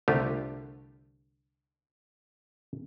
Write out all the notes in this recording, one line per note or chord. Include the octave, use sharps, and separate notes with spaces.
C2 D3 A3 F4 G4 A#5